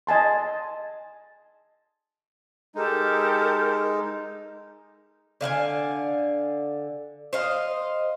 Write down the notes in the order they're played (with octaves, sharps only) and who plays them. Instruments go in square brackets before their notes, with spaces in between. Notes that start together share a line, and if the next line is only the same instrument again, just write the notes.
[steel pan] D#5 G#5 A5 C6
[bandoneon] G#3 D#4 [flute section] G4 A4 A#4
[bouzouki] D3 F5 F#5 G#5
C5 D#5 F5